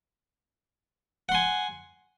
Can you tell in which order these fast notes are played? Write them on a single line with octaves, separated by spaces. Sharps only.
F#5 C6 G#5